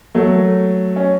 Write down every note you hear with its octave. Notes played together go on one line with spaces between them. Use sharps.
F#3 A3
C#4